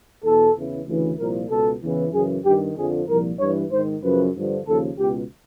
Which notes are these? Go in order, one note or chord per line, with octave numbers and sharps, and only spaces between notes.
E2 B2 A4
E2 C#3 E3
D2 C#3 E3
C2 A#2 F3 A#4
C#2 B2 A4
E2 C#3 E3
F#2 C#3 E3 G#4
G2 D#3 G4
F2 D3 F3 G#4
C2 A#2 F3 A#4
G2 E3 C#5
G#2 D#3 C5
F#2 C#3 F3 B4
G2 D3 F3
D#2 C#3 F3 A4
C#2 B2 G4